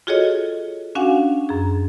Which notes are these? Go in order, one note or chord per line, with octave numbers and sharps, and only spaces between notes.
F4 F#4 G#4 A4 C#5 D#5
C#4 D4 F#4 F5 F#5 G#5
F#2 G#4